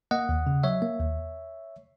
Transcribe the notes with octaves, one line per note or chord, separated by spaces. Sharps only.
A#3 D#5 F#5
D#2
C#3
F#3 C#5 E5
A#3
D#2